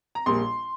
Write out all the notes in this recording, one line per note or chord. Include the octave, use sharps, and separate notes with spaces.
A#5
A#1 A#2 G3 A#3 C6